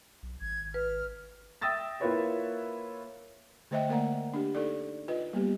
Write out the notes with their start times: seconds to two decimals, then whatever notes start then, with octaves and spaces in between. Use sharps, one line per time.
0.23 B1
0.41 G#1 G#6
0.74 B4 F6
1.61 E5 G5 D#6 E6 A6 A#6
2.00 A#3 E4 F4 B4 C#5 E5
3.71 D3 A3 C5 D#5 E5 G5
3.89 A#3 A#4 D5 F#5 A#5
4.34 D4 G4
4.55 D#4 A4 D5
5.08 F4 B4 D#5
5.33 G3 A#3 B3 G4